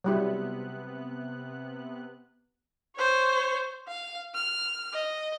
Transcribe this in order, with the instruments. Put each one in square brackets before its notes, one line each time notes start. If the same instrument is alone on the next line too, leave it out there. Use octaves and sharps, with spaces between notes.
[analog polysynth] C3 B3 F#6 [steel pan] F#3 G3 E4
[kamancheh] C5 C#5
F5
F6
D#5